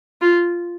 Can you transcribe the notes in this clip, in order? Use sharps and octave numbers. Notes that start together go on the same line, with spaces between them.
F4